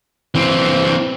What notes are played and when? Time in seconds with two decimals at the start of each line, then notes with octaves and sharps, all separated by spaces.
0.35 E3 C4